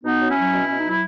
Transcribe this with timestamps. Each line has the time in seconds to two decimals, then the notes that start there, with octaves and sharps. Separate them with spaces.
0.04 B2 B3 D#4
0.20 F#3
0.29 C#4 E4
0.37 F#3
0.53 B2
0.65 B2 C#4
0.77 D#4
0.85 F#3 E4